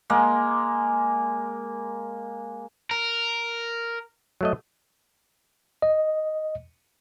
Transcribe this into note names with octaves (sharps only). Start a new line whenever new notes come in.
G#3 A#3
A#4
F#3 A3 D#5
D#5